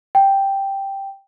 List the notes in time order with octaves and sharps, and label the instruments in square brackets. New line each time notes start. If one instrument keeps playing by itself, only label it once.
[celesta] G5